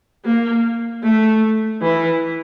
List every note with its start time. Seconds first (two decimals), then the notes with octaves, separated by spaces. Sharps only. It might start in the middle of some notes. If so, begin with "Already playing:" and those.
0.25 A#3
1.03 A3
1.81 E3